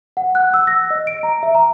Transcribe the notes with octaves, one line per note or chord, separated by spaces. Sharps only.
F#5
F#6
E6
A#6
D#5
D7
A#5
E5
A#5